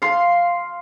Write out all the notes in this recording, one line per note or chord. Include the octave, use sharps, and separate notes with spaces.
F5 C6